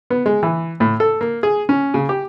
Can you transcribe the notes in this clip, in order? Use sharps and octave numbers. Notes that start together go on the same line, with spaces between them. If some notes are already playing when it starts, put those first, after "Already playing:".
B3
G#3
E3
A2
A4
A#3
G#4
C#4
C#3
G4